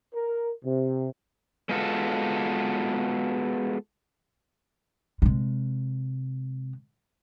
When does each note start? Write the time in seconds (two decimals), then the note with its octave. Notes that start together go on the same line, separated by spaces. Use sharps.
0.15 A#4
0.65 C3
1.69 G#3 B3 F4 F#4 A4
5.22 C3 G#3